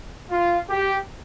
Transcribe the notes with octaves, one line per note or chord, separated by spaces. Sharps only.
F4
G4